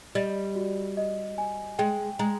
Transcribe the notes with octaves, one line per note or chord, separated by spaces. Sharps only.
G3 D#5
F#4
D#5
G#5
G#3 G5
G#3 A#5